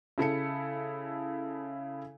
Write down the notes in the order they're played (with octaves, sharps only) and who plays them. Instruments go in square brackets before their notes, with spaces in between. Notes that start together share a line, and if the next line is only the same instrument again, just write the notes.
[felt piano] C#3 E4 A4 C#7